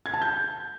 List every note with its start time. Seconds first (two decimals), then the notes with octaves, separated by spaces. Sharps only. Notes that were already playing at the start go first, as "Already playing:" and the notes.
0.06 G#6
0.14 A5
0.22 G6